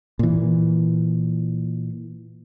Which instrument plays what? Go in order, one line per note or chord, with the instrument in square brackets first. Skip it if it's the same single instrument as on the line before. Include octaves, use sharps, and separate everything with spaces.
[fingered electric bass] A#2 E3